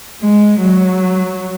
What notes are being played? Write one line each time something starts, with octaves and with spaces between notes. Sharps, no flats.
G#3
F#3